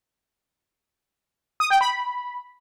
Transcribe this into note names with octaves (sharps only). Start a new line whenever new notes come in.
D#6
G5
B5